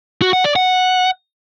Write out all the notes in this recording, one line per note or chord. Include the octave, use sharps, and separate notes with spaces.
F#4
F#5
D5
F#5